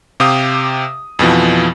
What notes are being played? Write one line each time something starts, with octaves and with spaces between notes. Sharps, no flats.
C3 G4 F5 D#6
F2 B2 E3 F3